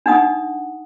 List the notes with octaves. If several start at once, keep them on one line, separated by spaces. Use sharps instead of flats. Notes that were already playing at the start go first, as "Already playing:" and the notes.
D4 D#4 F#5 D#6